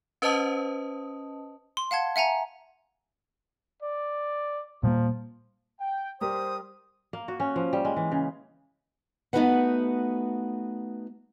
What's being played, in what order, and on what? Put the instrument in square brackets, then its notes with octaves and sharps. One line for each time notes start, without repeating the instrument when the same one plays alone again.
[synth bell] C#4 B4 C5 D#5 A5 D#6
[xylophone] C6
F5 F#5 A5 G#6
E5 F#5 G#5 A#5
[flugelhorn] D5
[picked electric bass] A#2 G3 A#3 [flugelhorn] F3
[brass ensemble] G5
[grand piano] G3 G4 A#4 [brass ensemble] C5 [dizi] D#6
[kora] A#3
F#4
C#4
F3
G3
G#3
E3
C#3
[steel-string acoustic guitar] A3 B3 D#4 F#4 B4 F#5